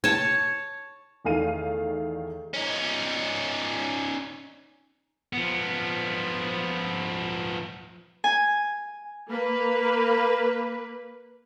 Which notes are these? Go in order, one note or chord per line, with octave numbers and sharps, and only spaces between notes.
C#5 A5
E2 D#3 A3 F5 D#7
C#4 D#4
F3 B3
G#5
A#3 B4